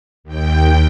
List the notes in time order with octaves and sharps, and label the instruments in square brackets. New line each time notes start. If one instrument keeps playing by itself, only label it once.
[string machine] D#2 G5